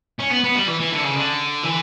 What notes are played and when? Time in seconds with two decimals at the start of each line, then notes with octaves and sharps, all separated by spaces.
0.20 C#4
0.31 B3
0.44 B3
0.55 G3
0.67 E3
0.80 E3
0.92 D3
1.03 C#3
1.16 D3
1.63 E3